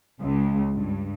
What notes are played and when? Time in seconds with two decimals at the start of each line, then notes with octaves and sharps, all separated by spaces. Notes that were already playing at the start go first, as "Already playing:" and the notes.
0.20 C#2
0.74 G2